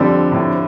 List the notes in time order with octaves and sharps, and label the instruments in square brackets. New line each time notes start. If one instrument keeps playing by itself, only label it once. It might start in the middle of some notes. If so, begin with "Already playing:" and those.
Already playing: [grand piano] F2 F3 C4 A4 D5 [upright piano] D3 G3
[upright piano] A2 D3